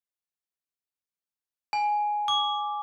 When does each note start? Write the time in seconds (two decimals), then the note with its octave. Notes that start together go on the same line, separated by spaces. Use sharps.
1.73 G#5
2.28 D6